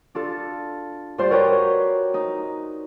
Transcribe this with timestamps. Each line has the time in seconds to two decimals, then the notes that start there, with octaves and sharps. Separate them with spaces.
0.15 D4 F4 A4
1.18 G2 F4 C5 D5 C6
1.30 F#4 A#4 B4 C#5 G5 D6
2.14 D#4